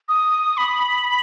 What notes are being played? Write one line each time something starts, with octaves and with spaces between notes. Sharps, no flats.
D#6
B5